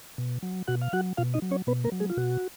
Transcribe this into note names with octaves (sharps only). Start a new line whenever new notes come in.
B2
F#3
B2 F#4 F#5
F5
F#3 F#4 F#5
B2 F4 F5
D#4 D#5
F#3
C#4 C#5
B2 B3 B4
A#3 A#4
F#3
G#3 G#4
F4
B2 F#4